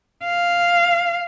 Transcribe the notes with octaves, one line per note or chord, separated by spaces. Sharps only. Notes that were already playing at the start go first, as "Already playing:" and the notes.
F5